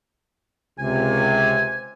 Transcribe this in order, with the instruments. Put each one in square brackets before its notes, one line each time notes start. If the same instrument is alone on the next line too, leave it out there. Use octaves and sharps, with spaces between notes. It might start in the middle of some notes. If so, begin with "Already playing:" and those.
[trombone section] C#2 C3 [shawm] G#5